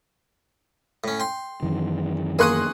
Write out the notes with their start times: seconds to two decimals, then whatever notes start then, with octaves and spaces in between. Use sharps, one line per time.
1.04 A2 C#4
1.20 G5 C6
1.63 F#2 D#3 E3
2.39 A#3 G#4 C6 C#6 D#6 F#6